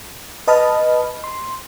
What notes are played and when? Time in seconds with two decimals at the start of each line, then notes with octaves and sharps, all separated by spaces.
0.47 B4 D#5 A5 B5 D#6 F6
1.24 C6